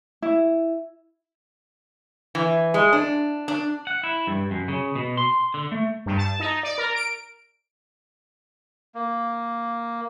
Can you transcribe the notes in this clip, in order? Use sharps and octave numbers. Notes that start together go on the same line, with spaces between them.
E4
E3
G#3
D4
D4
F#5
E4
G2
F#2
C#3
B2
C6
D3
A3
G2
A5
D#4
D5
A#4
D7
A#3